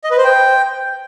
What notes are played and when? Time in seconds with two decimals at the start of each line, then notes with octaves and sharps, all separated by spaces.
0.04 D#5
0.11 B4
0.17 C5
0.24 G5